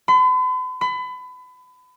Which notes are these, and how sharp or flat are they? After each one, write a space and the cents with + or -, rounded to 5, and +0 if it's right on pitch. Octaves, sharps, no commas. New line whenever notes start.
B5 +45
B5 +30